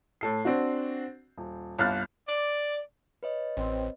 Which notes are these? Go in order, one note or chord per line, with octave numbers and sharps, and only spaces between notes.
A2 A4 C7
C4 D4 F#4
D#1
G1 C2 F5 F6 F#6 A6
D5
B4 C#5 D#5
A1 C4